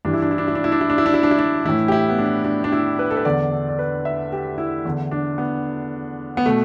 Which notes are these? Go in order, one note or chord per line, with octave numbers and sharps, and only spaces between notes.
G2 E3 D4
E4
D4
E4
D4
E4
D4
E4
D4
E4
D4
E4
D4
E4
D4
E4
D4
A2 E3 E4
G4
E4
B3
D4
D4
D4
E4
B4
A4
B4
E2 D3 D5
A4
D5
B4
E5
G4
E4
E2 D3
D4
B3
B3
B2 A3